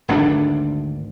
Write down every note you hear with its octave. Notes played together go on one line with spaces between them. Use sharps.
G#1 D2 C4 D4